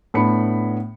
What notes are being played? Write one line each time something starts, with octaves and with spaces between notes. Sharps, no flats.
A2 B3 D4 B5 C#7